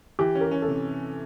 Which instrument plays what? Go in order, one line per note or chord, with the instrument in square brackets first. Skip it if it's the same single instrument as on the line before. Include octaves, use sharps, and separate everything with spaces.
[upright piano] E3 [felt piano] G4
[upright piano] C#4
[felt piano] A#4
[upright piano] C#4
[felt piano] A4
[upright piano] C3